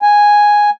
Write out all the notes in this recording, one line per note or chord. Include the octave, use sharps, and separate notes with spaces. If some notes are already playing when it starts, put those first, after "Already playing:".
G#5